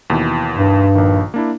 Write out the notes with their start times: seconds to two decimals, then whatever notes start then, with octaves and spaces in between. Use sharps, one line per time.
0.10 D#2 B2 E3
0.58 G2
0.95 A#1 D#3
1.34 A#3 D4 E4